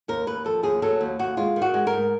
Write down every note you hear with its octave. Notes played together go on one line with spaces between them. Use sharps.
D#2 A#4
D#2 B4
F3 A4
D#2 G#4
F#3 A4
D#2
D#2 F#4
G#3 F4
D#3
F#4
G#3
A#4
G#2